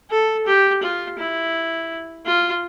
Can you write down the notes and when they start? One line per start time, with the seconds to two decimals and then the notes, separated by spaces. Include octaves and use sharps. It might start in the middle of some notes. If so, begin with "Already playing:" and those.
0.11 A4
0.47 G4
0.83 F4
1.18 E4
2.26 F4